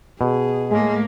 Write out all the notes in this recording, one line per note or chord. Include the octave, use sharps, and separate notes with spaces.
B2 G#4
A2 G#3 A#3